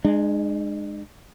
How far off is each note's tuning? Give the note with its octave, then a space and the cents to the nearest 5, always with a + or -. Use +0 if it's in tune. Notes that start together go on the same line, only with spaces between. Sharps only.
G#3 +0 D4 +45